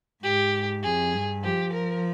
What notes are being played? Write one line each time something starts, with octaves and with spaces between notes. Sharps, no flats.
G#2 G4
F2 G#4
G2
F3 G4
A#4